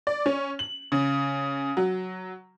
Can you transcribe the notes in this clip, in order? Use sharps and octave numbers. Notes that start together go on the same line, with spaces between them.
D5
C#4
F#7
C#3
F#3